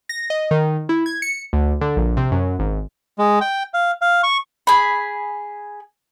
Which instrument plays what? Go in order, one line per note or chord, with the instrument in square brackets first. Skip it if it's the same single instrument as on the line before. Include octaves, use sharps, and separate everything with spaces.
[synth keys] A#6
D#5
D#3
E4
G#6
C#7
D2
D3
A#1
C3
F#2
G#1
[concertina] G#3
G5
F5
F5
C#6
[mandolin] G#4 B5